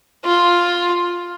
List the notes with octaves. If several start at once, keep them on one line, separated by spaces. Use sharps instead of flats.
F4